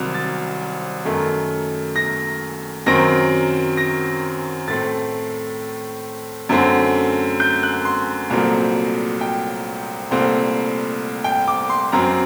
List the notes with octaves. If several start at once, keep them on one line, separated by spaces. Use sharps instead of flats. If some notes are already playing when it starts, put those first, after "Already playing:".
Already playing: C2 C3 D#3 F#3 C4
A6
F#2 D#3 A3
A#6
F#2 D#3 F#3 C4 A#6
A#6
A2 A3 C4 A6
F#2 D3 A3 C4
G6
F#6
C6
C2 A#2 F#3 A3 C4 A#5
G5
C2 A#2 A3 C4
G5
D6
C6
F#2 F#3 C4 A#5